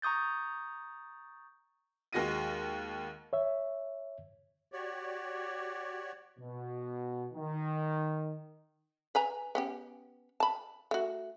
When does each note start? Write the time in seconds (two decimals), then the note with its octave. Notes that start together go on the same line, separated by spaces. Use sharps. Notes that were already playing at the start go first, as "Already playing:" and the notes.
0.02 A#5 C#6 D#6 G6 A6
2.13 D#2 G#3 F#4 A#6 D#7
3.33 C#5 E5
4.72 F#4 G4 C#5 D5
6.39 B2
7.34 D#3
9.15 B4 G#5 A#5
9.55 B3 C#4 G4
10.40 A5 B5
10.91 A3 F#4